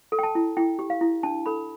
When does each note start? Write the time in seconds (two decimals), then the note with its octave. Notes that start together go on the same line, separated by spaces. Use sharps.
0.12 A4
0.19 G5
0.23 A5
0.35 E4
0.57 E4 G5
0.79 G4
0.90 F5
1.01 E4
1.23 D4 A5
1.46 A4 B5